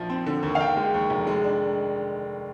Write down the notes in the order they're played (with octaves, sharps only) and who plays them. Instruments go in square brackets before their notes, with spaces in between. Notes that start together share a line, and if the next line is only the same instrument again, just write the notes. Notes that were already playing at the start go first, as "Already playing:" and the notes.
Already playing: [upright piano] A#1 F3
C4
D3
D#2
[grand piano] F5
[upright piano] D#3 [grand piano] G5
[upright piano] G#3
D#2
F1
G#3
D4